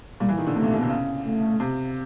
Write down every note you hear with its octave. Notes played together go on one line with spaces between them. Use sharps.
A#2 G3
E3
D#3
D3
C3 A3
A#2
B2
C3
C#3
A3
C3